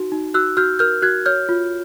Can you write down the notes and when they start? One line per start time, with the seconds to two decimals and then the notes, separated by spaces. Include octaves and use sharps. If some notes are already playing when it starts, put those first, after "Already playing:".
Already playing: D#4 F#4
0.12 D#4
0.34 F#4 E6 F#6
0.57 F#4 F6 G6
0.79 A#4 F6 G6
1.02 F#4 F#6 G#6
1.26 C#5 F6 G6
1.49 F4